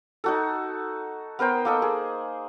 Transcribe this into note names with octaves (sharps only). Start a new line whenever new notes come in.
D#4 F#4 A4
B3 A#4 C5 G5
A#3 A4 D#5
G#4